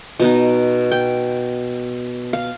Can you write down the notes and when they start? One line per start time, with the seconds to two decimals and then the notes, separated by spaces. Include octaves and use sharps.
0.19 B2 B3 D#4 D#5
0.91 G5
2.33 F5